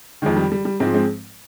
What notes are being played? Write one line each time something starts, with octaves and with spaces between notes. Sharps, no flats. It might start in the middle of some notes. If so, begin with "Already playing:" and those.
F2 D#3 G#3
G3
G3
G3
G#2 F3 G#3 C4
G#3 C4